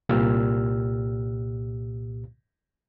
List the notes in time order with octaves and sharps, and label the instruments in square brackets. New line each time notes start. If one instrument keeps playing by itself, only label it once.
[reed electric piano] C2 A#2 G4 E6 F6